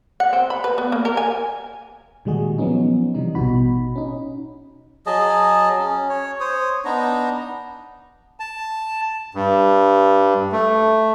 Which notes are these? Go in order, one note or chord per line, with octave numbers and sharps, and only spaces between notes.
F#5
C4
B5
B4
B3
A#3
A#4
G#5
A#2 D#3 G3 G#3 F#4 G#4
F3 F#3 B3 C#4 D#4
C3 E3 G3 D#4
A1 B2 D#4 F#4 B5
C#4 D#4
F#3 G#4 D#5 A5
C#4
C#5
C5 C#5 D#6
B3 D4 D#4 A#5
A5
G2
A3